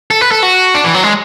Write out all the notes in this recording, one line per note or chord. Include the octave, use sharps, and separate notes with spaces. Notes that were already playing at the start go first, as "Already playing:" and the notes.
A4
B4
A4
F#4
D4
E3
F#3
G#3